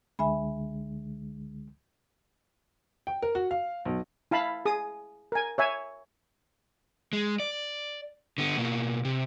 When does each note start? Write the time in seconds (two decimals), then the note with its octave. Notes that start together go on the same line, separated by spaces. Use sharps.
0.19 C#2 D3 G#3 E5 G#5 B5
3.07 G5
3.22 A#4
3.35 F#4
3.51 F5
3.85 B1
4.31 E4 F5 A5 B5
4.65 G#4 D#6
5.32 A#4 G#5
5.58 C#5 E5 G#5
7.13 G#3
7.40 D5
8.38 D3 B3
8.58 B2 A#3
9.05 C3